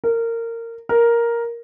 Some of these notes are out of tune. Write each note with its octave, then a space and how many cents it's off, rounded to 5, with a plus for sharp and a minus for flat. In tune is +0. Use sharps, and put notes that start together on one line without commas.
A#4 -20
A#4 +5